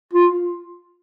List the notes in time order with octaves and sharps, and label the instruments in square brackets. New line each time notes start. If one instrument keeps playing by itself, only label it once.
[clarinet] F4